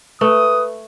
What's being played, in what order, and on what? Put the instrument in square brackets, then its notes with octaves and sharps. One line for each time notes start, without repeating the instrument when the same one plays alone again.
[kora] A3 [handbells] B4 [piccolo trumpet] D#6